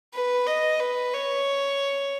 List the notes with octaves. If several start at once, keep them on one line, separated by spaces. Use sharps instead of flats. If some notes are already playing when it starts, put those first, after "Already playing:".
B4
D#5
B4
C#5